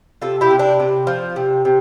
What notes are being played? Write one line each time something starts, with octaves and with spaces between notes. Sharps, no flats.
C3 F4 A4
E4 G4
C3
D4
C3
F3
C3
C3